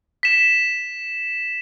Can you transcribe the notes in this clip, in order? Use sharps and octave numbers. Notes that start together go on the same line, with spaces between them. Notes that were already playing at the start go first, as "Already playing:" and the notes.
B6 E7